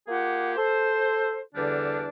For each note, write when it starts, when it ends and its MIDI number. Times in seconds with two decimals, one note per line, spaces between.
0.08 0.53 58
0.08 0.53 65
0.08 0.53 67
0.08 0.53 68
0.08 0.53 78
0.56 1.40 69
0.56 1.40 72
1.54 2.08 40
1.54 2.08 50
1.54 2.08 55
1.54 2.08 62